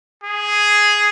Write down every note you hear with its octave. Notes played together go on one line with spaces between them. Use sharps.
G#4